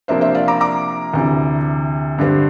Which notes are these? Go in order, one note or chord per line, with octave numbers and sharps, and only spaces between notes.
C3 F3 A#3 D4 C5 E5
C5 E5
D5 F5
A#5 D6
A#5 D6
D2 C3 E3
G2 D3 G3 C4